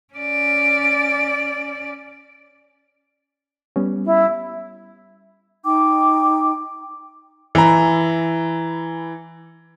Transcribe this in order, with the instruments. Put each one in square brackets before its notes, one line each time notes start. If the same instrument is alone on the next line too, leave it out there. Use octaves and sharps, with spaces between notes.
[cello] C#4 D5
[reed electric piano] G3 B3 C#4
[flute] E4
[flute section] D#4 G5 D6
[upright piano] E3 A#5